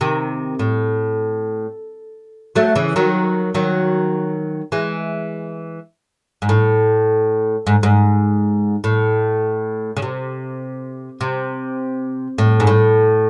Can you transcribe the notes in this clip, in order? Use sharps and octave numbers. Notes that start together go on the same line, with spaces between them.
C3 D#3
A2
F#3 A3
C#3 E3
D#3 F#3
D#3 F#3
E3 G#3
G#2
A2
G#2
G#2
A2
C#3
C3
C3
A2
G#2
A2